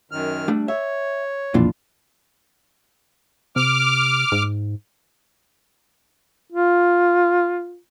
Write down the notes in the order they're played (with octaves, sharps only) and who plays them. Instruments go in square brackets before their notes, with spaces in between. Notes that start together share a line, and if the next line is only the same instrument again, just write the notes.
[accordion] F#2 D#3 F6
[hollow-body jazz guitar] G3 A3 D4
[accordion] C#5 [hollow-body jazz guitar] E5
[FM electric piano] B1 F2 A#2 [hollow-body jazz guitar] E3 D4 F4
[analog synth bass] C3 [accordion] D6 F6
[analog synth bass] G#2
[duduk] F4